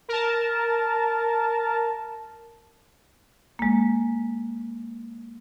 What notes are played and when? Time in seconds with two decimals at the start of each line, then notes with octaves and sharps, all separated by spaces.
0.08 A#4 A5
3.59 G#3 A#3